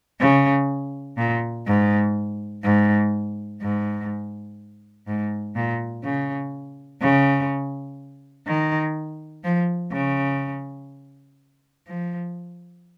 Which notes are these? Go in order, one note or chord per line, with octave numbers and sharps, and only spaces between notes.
C#3
A#2
G#2
G#2
G#2
G#2
A#2
C#3
C#3
D#3
F3
C#3
F3